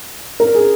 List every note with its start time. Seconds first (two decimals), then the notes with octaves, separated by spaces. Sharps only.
0.40 A#4
0.55 G#4